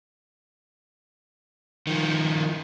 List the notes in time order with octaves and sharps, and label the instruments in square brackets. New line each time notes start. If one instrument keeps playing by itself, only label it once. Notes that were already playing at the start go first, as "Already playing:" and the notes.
[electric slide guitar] D#3 F3